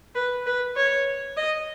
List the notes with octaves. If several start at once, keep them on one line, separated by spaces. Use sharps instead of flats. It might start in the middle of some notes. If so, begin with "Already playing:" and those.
B4
B4
C#5
D#5